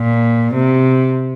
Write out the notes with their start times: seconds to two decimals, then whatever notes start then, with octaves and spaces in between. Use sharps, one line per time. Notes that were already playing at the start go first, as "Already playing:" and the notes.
Already playing: A#2
0.55 C3